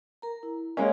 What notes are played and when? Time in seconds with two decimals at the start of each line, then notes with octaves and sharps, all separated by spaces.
0.22 A#4 A#5
0.43 E4
0.77 G#3 A#3 C#4 C#5 G#5